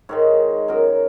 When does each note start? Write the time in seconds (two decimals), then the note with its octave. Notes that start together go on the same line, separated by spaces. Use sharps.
0.09 G#2 D#3 G#3 C#5
0.68 F#2 F#3 A#4